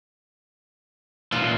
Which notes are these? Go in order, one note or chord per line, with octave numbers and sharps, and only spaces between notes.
A#2 E3 F4